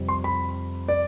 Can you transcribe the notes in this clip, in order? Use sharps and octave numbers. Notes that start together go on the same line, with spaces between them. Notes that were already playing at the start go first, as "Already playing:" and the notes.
Already playing: F2 C3 G3 C4
C6
B5
D5